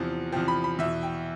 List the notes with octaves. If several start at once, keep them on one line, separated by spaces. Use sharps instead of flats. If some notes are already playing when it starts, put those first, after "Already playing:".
Already playing: E2 C3 F3
E2 C3 F3 G5
B5
B5
E2 B2 E5
G5